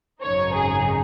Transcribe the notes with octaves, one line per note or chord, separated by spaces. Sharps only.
G#1 F#2 C#3 F#3 D#4 C#5
G#4